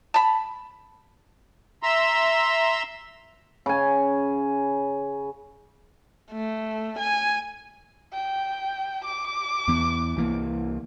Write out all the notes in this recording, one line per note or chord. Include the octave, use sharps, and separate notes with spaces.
A5 B5
E5 A#5 C6 E6
C#3 G#5
A3
G#5
G5
D6
E2 E3 B3
C2 E3 A#3